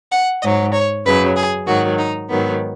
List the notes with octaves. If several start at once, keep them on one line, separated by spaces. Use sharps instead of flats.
F#5
G#2 F#3 D#5
C#5
F#2 C#3 F#3 B4
G#4
G#2 D#3 F#3 F#4
D#4
G#2 D#3 F#3 B3